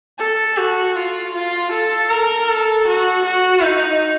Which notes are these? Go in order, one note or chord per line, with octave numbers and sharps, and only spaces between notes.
A4
F#4
F4
F4
A4
A#4
A4
F#4
F#4
D#4